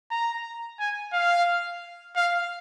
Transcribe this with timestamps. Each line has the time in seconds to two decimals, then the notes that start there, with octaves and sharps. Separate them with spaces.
0.11 A#5
0.79 G#5
1.13 F5
2.16 F5